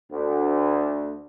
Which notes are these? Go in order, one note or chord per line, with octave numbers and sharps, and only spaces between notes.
D2